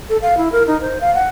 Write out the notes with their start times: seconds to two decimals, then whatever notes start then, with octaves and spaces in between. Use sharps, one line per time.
0.09 A4
0.22 F5
0.37 E4
0.52 A#4
0.67 D#4
0.81 C5
1.01 F5
1.15 F#5